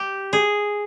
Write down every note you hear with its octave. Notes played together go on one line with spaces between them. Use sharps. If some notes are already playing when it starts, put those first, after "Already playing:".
Already playing: G4
G#4